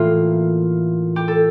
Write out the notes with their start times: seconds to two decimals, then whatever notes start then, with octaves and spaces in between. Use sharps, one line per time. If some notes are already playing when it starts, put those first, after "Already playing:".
Already playing: A2 E3 A#3 F4
1.16 G4
1.28 A4